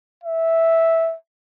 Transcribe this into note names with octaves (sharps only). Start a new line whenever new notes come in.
E5